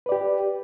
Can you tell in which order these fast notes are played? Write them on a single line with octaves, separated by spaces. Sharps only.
B4 D5 G4